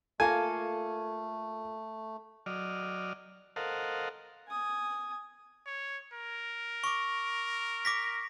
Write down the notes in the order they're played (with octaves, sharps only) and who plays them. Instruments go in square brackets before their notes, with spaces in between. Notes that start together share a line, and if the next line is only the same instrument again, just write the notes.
[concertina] A3 [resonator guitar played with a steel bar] A#3 F4 A4 [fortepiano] G#5
[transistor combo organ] F#3 D5 D#5 F6
A4 A#4 C5 D#5 F5 F#5
[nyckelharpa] G#5 D#6
[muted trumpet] C#5
A#4
[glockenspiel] C#6 D6
D6 A#6 B6